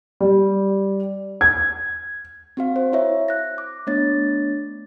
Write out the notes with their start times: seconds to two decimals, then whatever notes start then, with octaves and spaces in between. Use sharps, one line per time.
0.21 G3
1.41 G#6
2.57 C4 F#4 F5
2.76 C5
2.92 E4 C#5 E5
3.28 F#6 A#6
3.58 D6
3.87 A3 B3 D4 C#5 A6